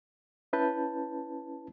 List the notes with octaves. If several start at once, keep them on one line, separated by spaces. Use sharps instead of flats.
C#4 E4 B4 A5 G6